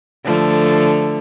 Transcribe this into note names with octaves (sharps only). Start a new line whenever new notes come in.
D3 F3 A3